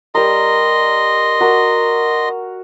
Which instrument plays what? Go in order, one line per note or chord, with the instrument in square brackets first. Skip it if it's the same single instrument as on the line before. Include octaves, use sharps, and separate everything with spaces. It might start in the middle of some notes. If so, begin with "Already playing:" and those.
[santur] G3 A#4 [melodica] D#5 C6
[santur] F#4 A#4